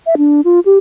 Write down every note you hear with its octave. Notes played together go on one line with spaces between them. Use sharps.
E5
D4
F4
G4